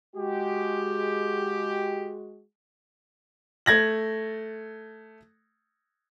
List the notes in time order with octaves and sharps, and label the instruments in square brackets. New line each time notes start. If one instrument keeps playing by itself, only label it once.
[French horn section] G#3 F#4 [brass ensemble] G4
[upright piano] A3 G#6 A#6 F#7